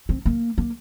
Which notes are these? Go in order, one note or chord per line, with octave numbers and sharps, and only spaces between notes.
C4
A#3
A#3